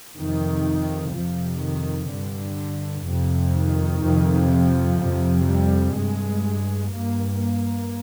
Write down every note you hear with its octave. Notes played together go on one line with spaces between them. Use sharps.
F2 C3 D#3
F2 C3 F3
D#3
G2 D3
F2 C3
D#3
F2 C3
F3
F2 C3
G3
G2 G#3
G2 A#3
A#3